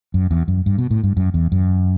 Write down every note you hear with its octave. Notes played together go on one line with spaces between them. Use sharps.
F#2
E2
F#2
G2
B2
A2
G2
F#2
E2
F#2